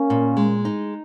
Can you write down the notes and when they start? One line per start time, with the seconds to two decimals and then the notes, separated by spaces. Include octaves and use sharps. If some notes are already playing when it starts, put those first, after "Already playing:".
Already playing: A#3 C#4
0.10 A#2
0.37 G#3
0.65 D#4